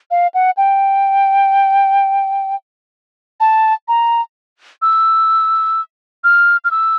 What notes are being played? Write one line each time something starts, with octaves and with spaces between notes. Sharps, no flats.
F5
F#5
G5
A5
A#5
E6
F6
F6
E6